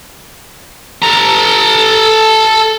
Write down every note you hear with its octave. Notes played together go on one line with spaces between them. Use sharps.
A4 A#5